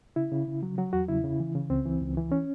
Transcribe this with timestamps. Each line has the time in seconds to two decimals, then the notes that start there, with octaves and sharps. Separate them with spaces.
0.16 C#3 E4
0.32 C#3
0.47 C#3
0.63 F#3
0.78 F#3 F#4
0.93 E2 F#4
1.08 C#3 E4
1.24 C#3
1.40 E3
1.55 C#3
1.70 C#2 C4
1.86 E3
2.01 C#2
2.17 E3
2.32 C#4